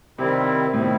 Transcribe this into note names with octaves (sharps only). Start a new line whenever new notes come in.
C3 D#3 G3 C4 E4
A2
B2 D#3 G3 C4 E4